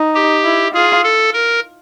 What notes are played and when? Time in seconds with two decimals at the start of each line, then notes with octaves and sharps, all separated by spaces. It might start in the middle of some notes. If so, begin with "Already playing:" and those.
Already playing: D#4
0.15 G4
0.44 E4
0.74 F4 G#4
1.03 A4
1.33 A#4